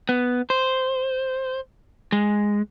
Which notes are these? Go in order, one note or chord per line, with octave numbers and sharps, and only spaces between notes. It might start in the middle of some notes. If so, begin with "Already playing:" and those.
B3
C5
G#3